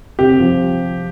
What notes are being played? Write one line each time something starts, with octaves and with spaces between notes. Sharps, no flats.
C3 G4
F3